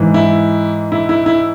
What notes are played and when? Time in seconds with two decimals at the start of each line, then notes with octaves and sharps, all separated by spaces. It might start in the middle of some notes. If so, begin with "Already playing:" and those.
Already playing: G#2 E3
0.14 E4
0.92 E4
1.09 E4
1.26 E4